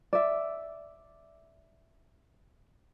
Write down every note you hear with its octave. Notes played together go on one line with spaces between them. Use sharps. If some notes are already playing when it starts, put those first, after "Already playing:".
D5 E5